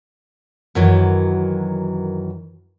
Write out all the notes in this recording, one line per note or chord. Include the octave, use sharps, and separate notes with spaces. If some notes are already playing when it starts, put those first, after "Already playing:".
F#2 D#3 E3 F#3